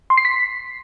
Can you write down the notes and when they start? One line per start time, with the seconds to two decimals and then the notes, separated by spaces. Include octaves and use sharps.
0.10 C6
0.17 C7
0.25 B6